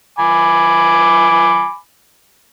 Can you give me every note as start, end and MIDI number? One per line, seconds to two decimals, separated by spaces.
0.19 1.76 80
0.19 1.76 83
0.19 1.76 86